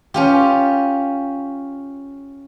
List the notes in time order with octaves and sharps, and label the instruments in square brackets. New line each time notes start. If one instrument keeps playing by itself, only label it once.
[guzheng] C#4 F4 G4